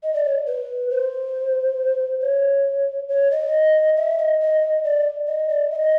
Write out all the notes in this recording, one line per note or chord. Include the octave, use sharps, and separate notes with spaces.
D#5
D5
C#5
B4
C5
C#5
C#5
D#5
E5
D#5
D#5
D5
D#5
D5
E5
D#5